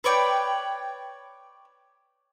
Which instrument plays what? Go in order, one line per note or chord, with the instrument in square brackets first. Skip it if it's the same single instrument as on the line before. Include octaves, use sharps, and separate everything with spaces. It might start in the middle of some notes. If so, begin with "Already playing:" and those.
[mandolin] B4 C#5 D5 G5